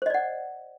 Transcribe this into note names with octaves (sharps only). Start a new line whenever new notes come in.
C5 D5 D#5 F#5